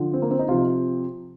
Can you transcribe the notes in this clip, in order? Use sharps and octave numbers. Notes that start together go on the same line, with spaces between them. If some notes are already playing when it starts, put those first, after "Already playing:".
Already playing: D3 F3
C4
A#3
C4
D#4
C3 F3 F4